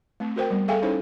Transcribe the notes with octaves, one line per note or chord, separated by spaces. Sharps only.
A3 C4
F#4 A#4 C5 G5
G3 B3
G#4 A4 E5 F5 G5 G#5
C#4 D#4 E4 A4 C5 C#5